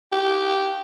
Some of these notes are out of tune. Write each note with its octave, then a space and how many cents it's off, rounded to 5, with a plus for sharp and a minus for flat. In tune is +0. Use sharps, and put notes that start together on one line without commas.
G4 -10